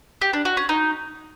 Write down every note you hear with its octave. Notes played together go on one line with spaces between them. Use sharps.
G4
D4
F#4
C#4
D#4